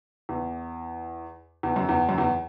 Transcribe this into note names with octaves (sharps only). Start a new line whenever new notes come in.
E2
E2
F#2
E2
F#2
E2